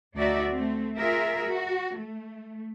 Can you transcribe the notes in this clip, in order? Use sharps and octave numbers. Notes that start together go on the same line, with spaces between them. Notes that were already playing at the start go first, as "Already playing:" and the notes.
D2 D#4 F#4 D5 E5
A3 C4
F4 G#4 A#4 E5
F#4
A3